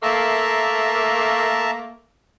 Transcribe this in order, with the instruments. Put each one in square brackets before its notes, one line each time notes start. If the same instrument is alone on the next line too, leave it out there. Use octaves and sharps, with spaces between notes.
[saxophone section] A3 A#3 [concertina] E5 A5 A#5